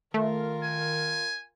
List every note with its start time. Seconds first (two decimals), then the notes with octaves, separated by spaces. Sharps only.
0.14 D#3 A3 F4 A#4
0.63 G#5